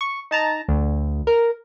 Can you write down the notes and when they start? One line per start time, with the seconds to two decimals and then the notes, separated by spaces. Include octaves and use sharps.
0.01 C#6
0.31 D#4 A5 A#5
0.68 D2
1.27 A#4